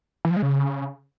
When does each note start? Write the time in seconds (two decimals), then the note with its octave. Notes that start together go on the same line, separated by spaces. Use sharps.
0.25 E3
0.31 F3
0.37 G#3
0.42 C#3